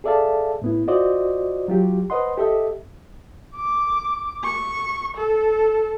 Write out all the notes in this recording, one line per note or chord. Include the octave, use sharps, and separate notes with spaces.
G#4 A4 D5 E5 F5 A5
A2 B3 E4
F4 F#4 C5 D5 D#5
F#3 F4 G4
B4 C5 D#5 F#5 C6
G4 A4 D#5 E5
D6
C#6
A4